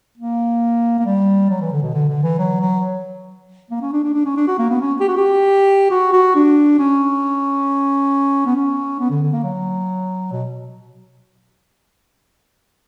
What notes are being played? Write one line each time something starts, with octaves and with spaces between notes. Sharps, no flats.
A#3
A#3
G3
F#3
E3
D3
B2
D3
D3
E3
F#3
F#3
A#3
C#4
D4
D4
D4
C#4
D4
F#4
A#3
B3
C#4
G4
F#4
G4
F#4
F#4
D4
C#4
B3
C#4
B3
D3
D3
A#3
F#3
B2